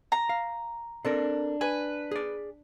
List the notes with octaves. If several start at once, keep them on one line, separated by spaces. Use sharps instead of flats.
A#5
F5
C4 D4 A4 A#4
B4 G#5
G#4 D5